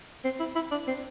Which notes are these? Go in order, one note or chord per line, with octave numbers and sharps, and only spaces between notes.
C4
E4
E4
D4
C4